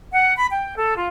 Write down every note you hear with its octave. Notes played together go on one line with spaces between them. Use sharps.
F#5
B5
G5
A4
F4